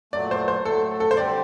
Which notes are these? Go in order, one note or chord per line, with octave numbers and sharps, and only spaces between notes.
A#2 F#3 A3 D5
C5
C5
A2 F#3 A3 A4
A4
C5
D3 G3 C4 G4 D5